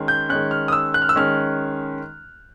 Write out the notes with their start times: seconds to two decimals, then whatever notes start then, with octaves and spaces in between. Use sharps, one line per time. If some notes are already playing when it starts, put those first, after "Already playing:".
Already playing: D#3 G#3 C#4
0.08 G6
0.29 D#3 G#3 C#4 F#6
0.51 F6
0.68 D#6
0.72 E6
0.94 F#6
1.02 F6
1.09 E6
1.16 D#3 G#3 C#4 F6